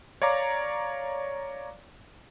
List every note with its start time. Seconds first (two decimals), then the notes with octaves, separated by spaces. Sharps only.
0.22 C#5 D5 F5 A#5 D6